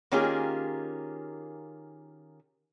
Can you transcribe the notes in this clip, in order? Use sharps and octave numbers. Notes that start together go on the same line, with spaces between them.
D#3 A#3 C#4 F4 G4 G#4